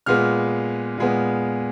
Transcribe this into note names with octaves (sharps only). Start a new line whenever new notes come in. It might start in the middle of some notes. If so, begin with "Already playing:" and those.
A#2 G#3 B3 F6
A#2 G#3 B3